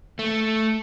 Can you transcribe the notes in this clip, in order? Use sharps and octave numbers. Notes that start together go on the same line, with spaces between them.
A3